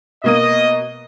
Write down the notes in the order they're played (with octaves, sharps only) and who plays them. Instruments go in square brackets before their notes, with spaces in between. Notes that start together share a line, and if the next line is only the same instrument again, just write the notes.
[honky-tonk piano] B2 A#3 D#7 [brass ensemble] D#5